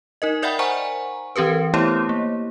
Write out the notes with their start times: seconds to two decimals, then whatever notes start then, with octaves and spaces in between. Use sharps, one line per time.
0.22 D#4 A#4 D#5
0.42 A#4 D5 E5 F#5 G5 B5
0.59 C5 F#5 G#5 A#5 C#6
1.36 E3 C4 G4 A#4 B4
1.74 A3 B3 E4 G4 C5 C#5
2.09 A#3